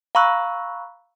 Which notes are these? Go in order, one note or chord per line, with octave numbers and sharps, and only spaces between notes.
F5 A#5 B5 C#6 E6 F#6